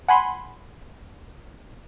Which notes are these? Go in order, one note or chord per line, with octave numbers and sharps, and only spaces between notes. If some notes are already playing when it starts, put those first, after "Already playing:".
F#5 G#5 B5 C6